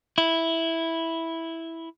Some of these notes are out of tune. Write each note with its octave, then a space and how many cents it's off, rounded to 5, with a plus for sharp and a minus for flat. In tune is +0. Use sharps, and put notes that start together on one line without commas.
E4 -5